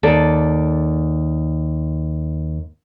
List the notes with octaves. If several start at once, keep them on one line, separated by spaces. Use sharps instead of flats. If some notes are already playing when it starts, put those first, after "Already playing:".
D#2 A4 D5